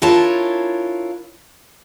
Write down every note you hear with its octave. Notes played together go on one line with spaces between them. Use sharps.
D4 E4 F4 A#4 C#5 A5